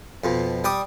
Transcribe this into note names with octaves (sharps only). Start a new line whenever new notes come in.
F2 B2
G3 G5 D6 D#6